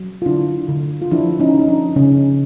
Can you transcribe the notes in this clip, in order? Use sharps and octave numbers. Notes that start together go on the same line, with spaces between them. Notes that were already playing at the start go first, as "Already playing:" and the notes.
Already playing: F#3
F4
D3 D4 E4
D3
F4
F3 D4 E4
C#4 D#4
F3 D#4
D4
C#3 C#4